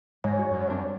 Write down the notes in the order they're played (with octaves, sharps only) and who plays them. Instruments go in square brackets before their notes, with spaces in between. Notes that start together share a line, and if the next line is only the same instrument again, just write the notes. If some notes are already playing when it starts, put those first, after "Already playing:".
[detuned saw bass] G#2 [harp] G#3 A#6 [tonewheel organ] C#5
[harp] F#4
[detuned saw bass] F#2
[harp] G2 C4 D4